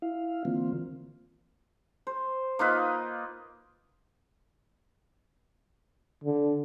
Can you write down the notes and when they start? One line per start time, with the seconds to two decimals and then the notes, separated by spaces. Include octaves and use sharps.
0.02 E4 F5
0.45 D3 E3 A#3 C4 F4
2.07 C5
2.59 A#3 D#4 F4 B4
6.24 D3